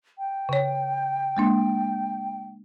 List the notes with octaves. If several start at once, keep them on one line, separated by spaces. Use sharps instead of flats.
G5
C#3 C#5
G#3 A#3 D4